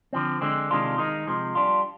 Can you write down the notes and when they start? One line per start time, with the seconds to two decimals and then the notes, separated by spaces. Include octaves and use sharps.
0.13 D3 F3 C4
0.41 D3 G#3 C4
0.70 C3 D#3 G#3 D4 F4
0.98 D#3 G#3 D#4
1.27 C3 F3 G#3
1.55 G3 D4 F4